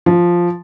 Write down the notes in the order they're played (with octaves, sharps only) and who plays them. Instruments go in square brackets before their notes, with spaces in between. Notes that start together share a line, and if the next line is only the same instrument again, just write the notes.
[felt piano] F3